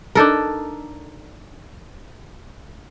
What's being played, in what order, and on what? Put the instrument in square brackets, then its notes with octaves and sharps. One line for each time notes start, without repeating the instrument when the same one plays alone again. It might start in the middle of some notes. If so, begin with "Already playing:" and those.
[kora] D4 D#4 A4 A#4